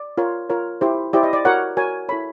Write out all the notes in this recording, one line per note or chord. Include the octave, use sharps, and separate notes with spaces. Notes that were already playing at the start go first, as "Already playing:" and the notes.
Already playing: D5
F4 A#4 C#5
F4 A#4 C#5
E4 G4 C5
E4 G4 C5 D5
D#5
D5
F#4 A#4 C#5 F#5
F#4 A#4 C#5 G#5
E4 A4 C#5 B5